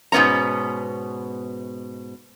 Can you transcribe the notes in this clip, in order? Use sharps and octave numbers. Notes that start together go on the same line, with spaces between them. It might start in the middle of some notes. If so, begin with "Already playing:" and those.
G#2 B2 B3 C#4 A#5